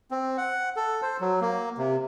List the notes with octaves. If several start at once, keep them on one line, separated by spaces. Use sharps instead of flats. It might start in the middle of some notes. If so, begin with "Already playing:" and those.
C4
F#5
A4
C5
F#3
A#3
C3